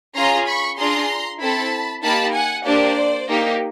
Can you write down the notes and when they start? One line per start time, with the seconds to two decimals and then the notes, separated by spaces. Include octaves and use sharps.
0.15 C#4 F4 G#4 A#5 C6
0.47 B5 C#6
0.78 D4 F4 G#4 A#5 C6
1.40 C4 E4 A4 A5 B5
2.03 A#3 D#4 G4 A5 B5
2.33 F#5 G#5
2.65 A#3 D4 G4 C5 D5
3.28 A#3 D#4 G4